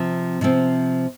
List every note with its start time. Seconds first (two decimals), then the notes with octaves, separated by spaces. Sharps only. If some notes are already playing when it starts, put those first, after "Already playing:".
Already playing: C3 F3 C4
0.41 C3 F3 C4